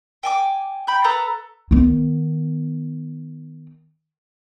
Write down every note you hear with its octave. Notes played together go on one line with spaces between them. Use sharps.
G5 G#5 D6
G5 B5 G6
A4 B4 A#5 D#6
D#3 B3